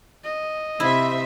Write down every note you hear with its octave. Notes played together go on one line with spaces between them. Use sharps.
D#5
C3 E4 C5 E5